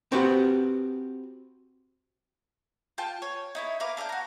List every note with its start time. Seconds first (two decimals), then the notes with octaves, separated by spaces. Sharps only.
0.12 C4 F#4 G4 B4 F#5
2.98 F4 G5 A5
3.22 C#5
3.55 D#4 E4 C#5
3.80 A#4 B4 F5 D6
3.97 D4 F5 D#6 G6
4.09 F#4 A#5